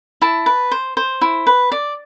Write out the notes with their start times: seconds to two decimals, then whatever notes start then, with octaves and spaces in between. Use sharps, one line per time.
0.22 E4 A5
0.46 B4
0.71 C5
0.97 C5
1.21 E4
1.47 B4
1.72 D5